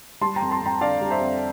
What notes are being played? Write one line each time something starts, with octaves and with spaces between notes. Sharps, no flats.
G3 A5 C6
G5 A#5
F2
A5 C6
F2 G5 A#5
D3 D5 F5
G3
C5 E5
F2